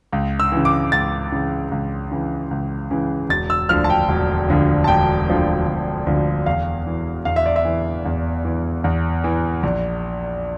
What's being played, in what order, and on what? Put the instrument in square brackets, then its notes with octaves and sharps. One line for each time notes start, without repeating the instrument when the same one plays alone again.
[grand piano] C#2
E6
C#3 E3
D6
C#2 A6
C#3 E3
C#2
C#3 E3
C#2
C#3 E3
E1 A6
E6
D2 D3 F3 F6
A5
G5
E1
D2 D3 F3
A5
E1 G5
D2 D3 F3
E1
D2 D3 F3
E2 F5
E3
E2 F5
E5
D5
E5
E3
E2
E3
E2
E3
A#1